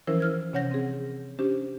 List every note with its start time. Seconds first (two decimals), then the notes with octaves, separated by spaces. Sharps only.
0.07 E3 F3 C#4 E4 A#4 C5
0.20 E4 F6 G#6
0.53 C3 C#4 C#5 F#5 G6 A#6
0.71 C4 G#4
1.39 C#4 D4 G4 C5